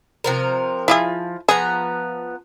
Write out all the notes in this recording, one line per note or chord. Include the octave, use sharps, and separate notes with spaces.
C3 F3 A#4
F3 E4 F4 G#4
F3 B3 G#4 A#5